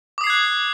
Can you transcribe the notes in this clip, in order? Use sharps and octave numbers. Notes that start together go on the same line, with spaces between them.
D6 D#6 F#6 G#6 C7